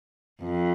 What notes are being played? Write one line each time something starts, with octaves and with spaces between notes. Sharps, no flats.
F2